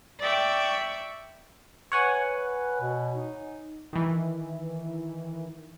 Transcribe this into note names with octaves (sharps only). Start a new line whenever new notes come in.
D5 E5 G5 C#6
B4 C#5 F#5 G#5
B2
D#4
D#3 E3